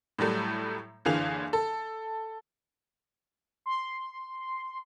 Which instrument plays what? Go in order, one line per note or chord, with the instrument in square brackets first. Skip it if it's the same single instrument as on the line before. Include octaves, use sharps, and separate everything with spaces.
[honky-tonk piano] A2 F#3 G3 A3
F#1 D3 E3 G#4 F5 F7
A4
[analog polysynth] C6